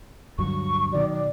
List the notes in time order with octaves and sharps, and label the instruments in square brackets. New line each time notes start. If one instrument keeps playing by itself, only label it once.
[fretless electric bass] D2 G2 F#3 [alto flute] C#6
[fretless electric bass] B2 D#3 F#3 [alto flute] D5
[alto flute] D5